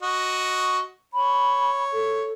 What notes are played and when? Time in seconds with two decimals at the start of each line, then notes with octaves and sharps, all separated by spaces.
0.02 F#4 D#5
1.14 C#5 B5
1.93 A4